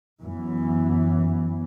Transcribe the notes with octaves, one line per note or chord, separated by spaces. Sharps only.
F#2 E3 B3